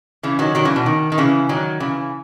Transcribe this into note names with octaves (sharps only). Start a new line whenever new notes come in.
C#3 E3
D#3 F#3
D#3 F#3
C#3 E3
B2
D#3
D#3
C#3 E3
D#3 F#3
C#3 E3